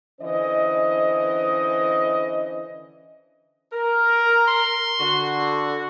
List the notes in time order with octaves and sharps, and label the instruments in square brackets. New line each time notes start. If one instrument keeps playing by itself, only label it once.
[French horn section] D3 E3 C#4 C5 D#5
[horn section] A#4
[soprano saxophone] C6
[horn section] D3 F#4